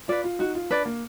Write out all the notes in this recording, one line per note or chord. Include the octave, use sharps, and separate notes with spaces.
F4 B4 D5
F4
D#4 F#4
F4
D4 B4 D5
A#3